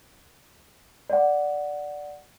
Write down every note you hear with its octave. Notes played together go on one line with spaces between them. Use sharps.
D5 F#5